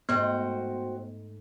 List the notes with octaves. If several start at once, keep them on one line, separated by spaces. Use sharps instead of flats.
G#2 A3 B3 C4 F#4 G5